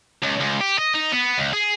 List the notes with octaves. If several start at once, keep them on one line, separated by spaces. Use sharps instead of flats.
C#2
C#2
G4
D#5
D#4
B3
C#2
G#4